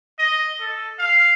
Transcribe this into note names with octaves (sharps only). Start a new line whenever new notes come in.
D#5
A4
F5